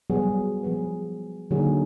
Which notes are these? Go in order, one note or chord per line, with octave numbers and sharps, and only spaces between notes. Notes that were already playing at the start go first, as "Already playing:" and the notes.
F#3 G3 B3 F#4 G#4
F3 B3 G#4 B4
D3 F#3 A#3 D#4 F#4 G#4